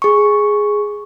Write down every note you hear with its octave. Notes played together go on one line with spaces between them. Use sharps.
G#4 C#6